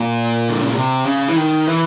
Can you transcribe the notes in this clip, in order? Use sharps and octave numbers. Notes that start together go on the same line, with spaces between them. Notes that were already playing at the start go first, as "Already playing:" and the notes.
Already playing: A#2
D3
C#3
C3
C#3
E3
D#3
E3